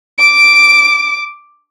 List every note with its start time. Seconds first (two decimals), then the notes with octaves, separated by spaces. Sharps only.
0.18 D6 D7